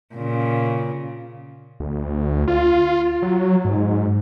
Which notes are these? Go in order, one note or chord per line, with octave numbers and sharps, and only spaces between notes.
A#2 C#3
D2
F4
F#3
G#2